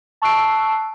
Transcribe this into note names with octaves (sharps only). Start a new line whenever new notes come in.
A5 C#6 E6 F#6 C7 D7